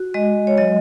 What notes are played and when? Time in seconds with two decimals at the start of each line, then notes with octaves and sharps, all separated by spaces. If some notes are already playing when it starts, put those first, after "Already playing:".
Already playing: F#4
0.14 G#3 D#5
0.47 C#5
0.58 F#3 D#5